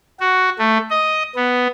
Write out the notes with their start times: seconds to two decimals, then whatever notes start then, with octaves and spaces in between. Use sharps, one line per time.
0.20 F#4
0.59 A3
0.90 D#5
1.36 B3